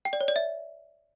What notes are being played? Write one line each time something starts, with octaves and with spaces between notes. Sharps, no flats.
G5
D5
C#5
D5
E5